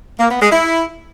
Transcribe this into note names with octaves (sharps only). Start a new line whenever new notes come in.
A#3
B3
G#3
E4